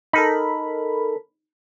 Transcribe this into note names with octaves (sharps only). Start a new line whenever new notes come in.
D#4 A4 A#4 B5